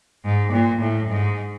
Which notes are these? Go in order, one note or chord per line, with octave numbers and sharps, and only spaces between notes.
G#2
A#2
A2
G#2